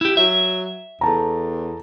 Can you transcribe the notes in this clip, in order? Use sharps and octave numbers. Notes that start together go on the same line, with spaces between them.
E4 G4
F#3 E5
E2 A4 A5 A#5